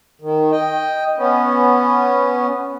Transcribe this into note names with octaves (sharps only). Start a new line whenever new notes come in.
D#3
D#5 G5
B3 C#4